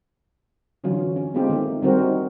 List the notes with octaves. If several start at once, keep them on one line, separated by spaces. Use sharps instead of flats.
D3 E3 F#3 C#4 F4
C#4
G#3 B3 C4 D#4 F4 G4
D#3 A3 C4 A4
D#3 G3 C4 F#4 A#4
D#4